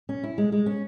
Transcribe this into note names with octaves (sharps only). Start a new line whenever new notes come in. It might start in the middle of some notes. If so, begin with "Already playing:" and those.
C#4
E4
G#3
G#3
C#4